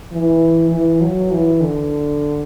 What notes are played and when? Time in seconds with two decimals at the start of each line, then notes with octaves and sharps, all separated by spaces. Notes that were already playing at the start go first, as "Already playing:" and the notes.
0.12 E3
0.71 E3
1.01 F#3
1.31 E3
1.61 D3